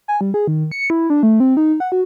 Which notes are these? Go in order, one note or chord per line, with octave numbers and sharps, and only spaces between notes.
G#5
G3
G#4
D#3
C#7
E4
D4
A3
C4
D#4
F#5
F#4